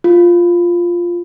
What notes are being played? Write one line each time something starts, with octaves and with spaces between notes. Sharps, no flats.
F4